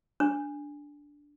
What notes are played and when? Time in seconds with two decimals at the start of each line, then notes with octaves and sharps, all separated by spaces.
0.20 D4